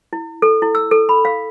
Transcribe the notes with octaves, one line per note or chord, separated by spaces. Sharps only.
E4
A4
E4
E6
A4
B5
F5